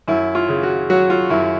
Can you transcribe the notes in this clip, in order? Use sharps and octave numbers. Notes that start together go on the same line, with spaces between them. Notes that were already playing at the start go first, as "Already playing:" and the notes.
F#2 E4
F4
C#3
F#4
F#3 F#4
F4
F#2 E4